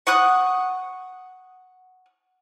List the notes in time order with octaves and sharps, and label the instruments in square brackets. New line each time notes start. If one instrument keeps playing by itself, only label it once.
[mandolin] F#5 C#6 D#6 F#6